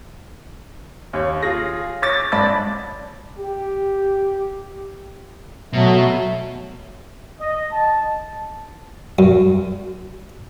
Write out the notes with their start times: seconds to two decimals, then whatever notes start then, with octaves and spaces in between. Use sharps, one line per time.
1.13 D#2 C#5
1.43 F4 G#4 A#6
2.02 C#5 D6 A6
2.32 G#2 D5 A5 B5 A6
3.38 G4
5.73 B2 F#3 A3
7.39 D#5
7.72 A5
9.19 F#2